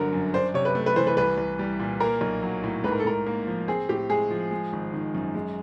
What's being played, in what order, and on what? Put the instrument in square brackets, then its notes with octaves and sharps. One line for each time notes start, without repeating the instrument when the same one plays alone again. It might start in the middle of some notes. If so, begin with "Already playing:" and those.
Already playing: [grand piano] G1 D3 F#3 [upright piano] A#4
[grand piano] F#2
[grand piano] D4 [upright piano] C5
[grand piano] C3 [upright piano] C#5
[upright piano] B4
[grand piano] A3
[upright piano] B4
[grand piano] E3 [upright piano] C5
[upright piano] B4
[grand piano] C2 [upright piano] B4
[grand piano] C2
G3
A#2
[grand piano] A#3 [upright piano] A#4
[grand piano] B1
F#3
A2
[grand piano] G#2 [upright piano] B4
[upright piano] A#4
A4
[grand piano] G#2 [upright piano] A#4
[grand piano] A#3
F3
[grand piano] C4 [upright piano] G#4
[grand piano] A2 [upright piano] G4
[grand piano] G#3 [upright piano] G#4
[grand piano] F3
G#3
G#1
D#3
F#2
G#3